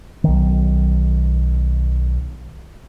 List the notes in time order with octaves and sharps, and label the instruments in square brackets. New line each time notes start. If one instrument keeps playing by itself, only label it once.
[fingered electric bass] B1 D#3